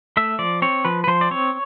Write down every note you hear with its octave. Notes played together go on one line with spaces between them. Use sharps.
A3 E5
F3 D5
C4 C#5
F3 B4
B4
F3 C5
D5
C4 C#5